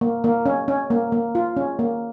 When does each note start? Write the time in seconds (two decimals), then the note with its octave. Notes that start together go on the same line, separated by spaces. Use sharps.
0.01 A#3
0.24 A#3
0.46 C#4
0.68 C#4
0.90 A#3
1.12 A#3
1.35 F4
1.57 C#4
1.79 A#3